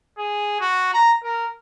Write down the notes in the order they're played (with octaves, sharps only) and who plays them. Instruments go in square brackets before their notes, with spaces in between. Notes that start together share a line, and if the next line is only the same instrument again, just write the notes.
[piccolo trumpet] G#4
F#4
A#5
A#4